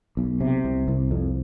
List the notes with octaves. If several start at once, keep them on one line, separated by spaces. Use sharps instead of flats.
B1
C3
C2
C2
F2